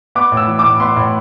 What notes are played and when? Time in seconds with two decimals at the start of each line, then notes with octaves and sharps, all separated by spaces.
0.15 B3 D6
0.32 A2
0.37 E6
0.48 E3
0.59 A2 D6
0.80 B3 C6
0.96 A2